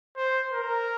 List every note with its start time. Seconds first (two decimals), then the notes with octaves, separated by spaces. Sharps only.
0.16 C5
0.52 A#4